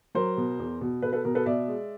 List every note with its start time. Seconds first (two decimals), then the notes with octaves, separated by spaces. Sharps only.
0.15 F#3 A#4 C5
0.37 B2
0.59 E2
0.81 B2
1.02 B2 A4 B4
1.13 A4 B4
1.25 B2 A#4
1.35 A4 B4
1.46 B2 D5 E5
1.68 G#3